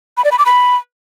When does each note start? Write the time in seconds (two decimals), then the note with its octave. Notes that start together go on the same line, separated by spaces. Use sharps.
0.17 B5
0.24 D5
0.32 B5
0.39 D6
0.46 B5